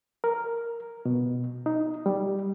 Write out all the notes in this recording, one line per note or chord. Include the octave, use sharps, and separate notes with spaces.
A#4
B2
D#4
G3